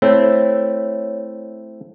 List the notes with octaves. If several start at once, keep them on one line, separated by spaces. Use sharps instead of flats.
A3 C4 E4 C#5